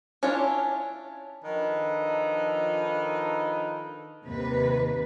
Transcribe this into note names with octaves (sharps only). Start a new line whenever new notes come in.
C#4 D4 E4 F4 C#5
D#3 F3 D4 D#4 A4 B4
D#2 C3 B4